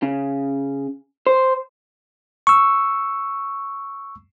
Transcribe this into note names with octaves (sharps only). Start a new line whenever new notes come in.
C#3
C5
C#6 E6